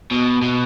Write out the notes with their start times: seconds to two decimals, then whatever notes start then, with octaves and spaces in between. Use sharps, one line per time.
0.11 B2
0.42 B2